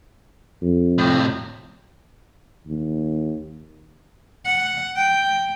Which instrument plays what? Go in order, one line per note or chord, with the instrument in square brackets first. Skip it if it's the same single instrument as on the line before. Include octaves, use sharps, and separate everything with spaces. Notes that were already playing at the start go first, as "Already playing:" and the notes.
[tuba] F2
[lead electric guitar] A2 C3
[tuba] D#2
[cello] F#5
G5